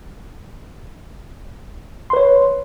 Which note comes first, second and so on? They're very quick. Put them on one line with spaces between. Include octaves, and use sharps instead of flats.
C6 B4 C#5